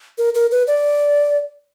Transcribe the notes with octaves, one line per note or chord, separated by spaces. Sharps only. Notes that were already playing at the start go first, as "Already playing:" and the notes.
A#4
A#4
B4
D5